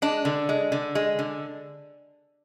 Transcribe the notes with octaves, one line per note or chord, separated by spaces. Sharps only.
G#3 D4
D3
G#3
D3
G#3
D3